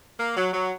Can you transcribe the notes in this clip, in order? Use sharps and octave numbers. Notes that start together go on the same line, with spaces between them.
A#3
F#3
F#3